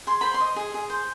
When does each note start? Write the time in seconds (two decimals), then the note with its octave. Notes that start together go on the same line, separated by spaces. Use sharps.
0.07 G#4 C6
0.21 C5 B5
0.34 C6
0.40 D#5
0.56 G#4
0.74 G#4
0.90 C5